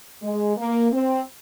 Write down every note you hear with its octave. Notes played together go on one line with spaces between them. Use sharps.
G#3
A#3
C4